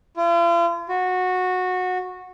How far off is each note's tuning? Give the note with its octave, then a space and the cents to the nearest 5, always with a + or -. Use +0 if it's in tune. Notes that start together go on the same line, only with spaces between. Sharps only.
F4 -45
F#4 -15